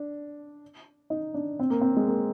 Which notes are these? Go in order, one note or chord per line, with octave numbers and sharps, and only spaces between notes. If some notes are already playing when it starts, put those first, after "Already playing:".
Already playing: D4
D#4
D4
C4
A#3
C4
G#3
A#3